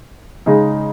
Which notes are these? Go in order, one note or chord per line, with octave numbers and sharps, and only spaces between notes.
C#3 G#3 D#4 G#4